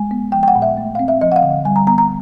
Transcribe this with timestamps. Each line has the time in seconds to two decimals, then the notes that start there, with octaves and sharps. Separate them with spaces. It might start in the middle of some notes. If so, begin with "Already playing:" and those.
Already playing: G#3 G#5
0.11 B3
0.32 F3 G5
0.43 G5
0.48 F#5
0.55 A#2
0.62 E5
0.77 A3
0.95 C4 F5
1.08 E5
1.21 F3 D#5
1.32 F#5
1.36 F5
1.43 D3
1.65 G3 G#5
1.76 A#5
1.87 B3 A#5
1.98 A#5